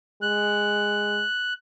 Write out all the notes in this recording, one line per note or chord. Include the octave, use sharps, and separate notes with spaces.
G#3 F#6